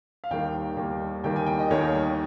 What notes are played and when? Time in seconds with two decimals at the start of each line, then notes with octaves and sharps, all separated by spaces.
0.24 F5
0.31 D#2 D#3 G3 A#3 G5
0.77 D#2 D#3 G3 A#3
1.24 D#2 D#3 G3 A#3 G5
1.36 G#5
1.46 G5
1.59 D#5
1.70 D#2 D#3 G3 A#3 C#5